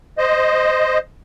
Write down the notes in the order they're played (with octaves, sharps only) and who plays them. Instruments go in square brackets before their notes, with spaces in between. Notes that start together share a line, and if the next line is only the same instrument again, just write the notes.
[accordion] C5 D#5